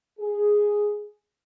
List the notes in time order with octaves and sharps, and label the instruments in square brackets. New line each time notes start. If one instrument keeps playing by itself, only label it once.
[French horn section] G#4